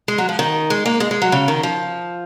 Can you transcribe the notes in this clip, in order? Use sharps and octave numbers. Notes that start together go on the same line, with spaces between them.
G#3
F#3
F3
D#3
G#3
A#3
G#3
G#3
F#3
C#3
D#3
F3